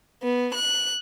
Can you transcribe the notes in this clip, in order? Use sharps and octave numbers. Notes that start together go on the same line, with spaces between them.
B3
F#6